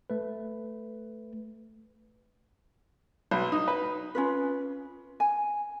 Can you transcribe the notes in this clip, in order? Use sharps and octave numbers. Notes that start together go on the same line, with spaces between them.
A3 B4
B1
D#4
B4
C#4 F4 B4
G#5